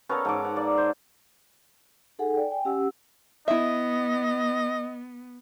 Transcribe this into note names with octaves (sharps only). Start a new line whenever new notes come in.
B3 C#4 A4 A#4 F5
G#2 A4 D6
F#5
A#3 D5
C5
D#4 G#4 A4 F#5 G#5
D5 G5
G5 G#5
C#4 G4 F#5 E6
B3 E4 D#5 E5